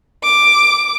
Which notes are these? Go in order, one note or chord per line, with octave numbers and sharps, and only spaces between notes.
D6